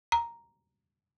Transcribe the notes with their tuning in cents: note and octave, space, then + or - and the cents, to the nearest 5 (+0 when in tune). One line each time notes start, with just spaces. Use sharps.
A#5 +0